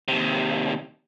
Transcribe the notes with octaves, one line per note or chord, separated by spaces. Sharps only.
D#2 C3